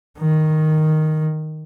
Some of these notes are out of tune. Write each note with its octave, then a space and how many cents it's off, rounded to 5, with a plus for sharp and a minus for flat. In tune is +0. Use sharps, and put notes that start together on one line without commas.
D#3 +0